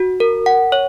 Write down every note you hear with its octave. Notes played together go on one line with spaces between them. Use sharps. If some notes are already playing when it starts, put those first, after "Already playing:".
Already playing: F#4
A#4
F#5
C#5